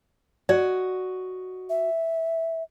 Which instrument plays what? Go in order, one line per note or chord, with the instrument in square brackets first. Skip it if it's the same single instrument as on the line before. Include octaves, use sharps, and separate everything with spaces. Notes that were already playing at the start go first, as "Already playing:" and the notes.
[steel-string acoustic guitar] F#4 D#5 [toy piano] D5
[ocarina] E5